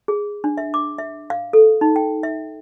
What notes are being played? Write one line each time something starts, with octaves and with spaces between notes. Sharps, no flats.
G#4
D4
E5
D6
E5
F5
A4
D#4
G5
E5